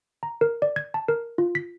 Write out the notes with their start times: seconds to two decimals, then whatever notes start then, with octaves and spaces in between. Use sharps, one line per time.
0.23 A#5
0.41 A#4
0.62 D5
0.76 G#6
0.94 A5
1.08 A#4
1.38 F4
1.55 B6